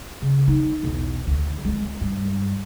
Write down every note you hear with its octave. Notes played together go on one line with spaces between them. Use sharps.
C#3
D#4
B1 E2
D2
G#3 C4
G2